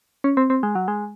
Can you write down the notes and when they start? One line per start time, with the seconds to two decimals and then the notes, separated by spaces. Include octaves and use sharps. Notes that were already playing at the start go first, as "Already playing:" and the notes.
0.24 C#4
0.37 C4
0.50 C4
0.63 G#3
0.75 F#3
0.88 G#3